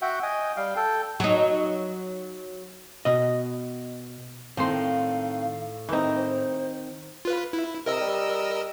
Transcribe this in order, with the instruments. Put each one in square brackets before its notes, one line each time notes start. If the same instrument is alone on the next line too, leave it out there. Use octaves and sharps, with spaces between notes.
[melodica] F#4 E5 F#5 G5
D#5 G5 G#5
G3 F5 G5
A4 G5
[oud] F#3 D#4
[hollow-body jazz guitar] B2 D#5
[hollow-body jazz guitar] A2 C6 [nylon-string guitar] D#3 A3 C4 [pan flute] F5
[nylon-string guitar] D#3 C4 [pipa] E3 D#4
[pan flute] C5
[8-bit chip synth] F4 B4
E4
[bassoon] C3 [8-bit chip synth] A#4 D#5 E6
[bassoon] G3